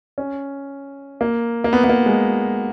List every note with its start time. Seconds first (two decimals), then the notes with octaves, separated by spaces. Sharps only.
0.18 C#4
1.21 A#3
1.64 A#3
1.73 B3
1.84 B3
1.89 A#3
2.06 G#3